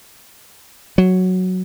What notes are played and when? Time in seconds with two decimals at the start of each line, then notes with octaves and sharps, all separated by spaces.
0.98 F#3